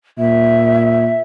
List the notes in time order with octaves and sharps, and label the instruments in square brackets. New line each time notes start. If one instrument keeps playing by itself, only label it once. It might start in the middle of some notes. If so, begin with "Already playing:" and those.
[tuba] A#2 [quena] E5